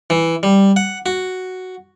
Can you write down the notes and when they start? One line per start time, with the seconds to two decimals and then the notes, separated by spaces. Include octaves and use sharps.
0.10 E3
0.43 G3
0.76 F#5
1.06 F#4